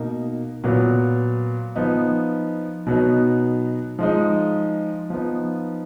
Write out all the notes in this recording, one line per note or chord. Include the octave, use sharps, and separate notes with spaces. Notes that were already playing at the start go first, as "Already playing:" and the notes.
Already playing: B2 A#3 D#4
A#2 F#3 B3
F3 B3 D#4
B2 F#3 B3 D#4
F3 G#3 D#4
F3 B3 D#4